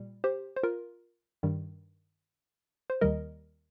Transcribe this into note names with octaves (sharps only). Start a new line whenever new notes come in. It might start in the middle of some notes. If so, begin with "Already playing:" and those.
Already playing: A#2 G3
G4 C5
C5
F4 A#4
G2 D#3 G3
C5
D#2 D#3 G3 A#4 D#5